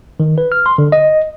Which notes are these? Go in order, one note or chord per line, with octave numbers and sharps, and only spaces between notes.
D#3
B4
F6
C6
D3
D#5